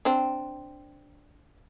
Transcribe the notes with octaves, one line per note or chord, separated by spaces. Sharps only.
C4 D4